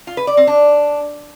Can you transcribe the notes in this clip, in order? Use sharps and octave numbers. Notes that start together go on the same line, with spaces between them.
F4
B4
D5
C4
D4